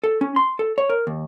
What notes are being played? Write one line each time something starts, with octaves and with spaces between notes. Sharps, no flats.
A4
C#4
C6
A4
C#5
A#4
D#2